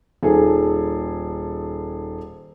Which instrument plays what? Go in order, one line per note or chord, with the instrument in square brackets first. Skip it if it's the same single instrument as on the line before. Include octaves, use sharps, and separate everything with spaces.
[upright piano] D#1 D#3 G#4 A4 G#5